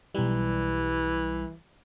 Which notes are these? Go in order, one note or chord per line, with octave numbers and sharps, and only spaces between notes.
B1 E3 G3